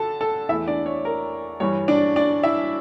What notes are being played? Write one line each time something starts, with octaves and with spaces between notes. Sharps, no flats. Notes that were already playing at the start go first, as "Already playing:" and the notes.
Already playing: D3 A4 A5
A4 A5
E2 E3 A3 E4 E5
D4 D5
C#5
A#4
G2 E3 G3 C#5
D4 D5
D4 D5
E4 E5